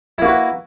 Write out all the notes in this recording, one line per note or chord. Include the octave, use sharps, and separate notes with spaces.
A#3 E4 F#4 B4